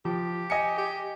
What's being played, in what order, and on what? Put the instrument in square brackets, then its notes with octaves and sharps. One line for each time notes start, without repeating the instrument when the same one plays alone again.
[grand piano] F3 [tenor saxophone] G4
[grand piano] D#5 G#5 C#7
[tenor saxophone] G4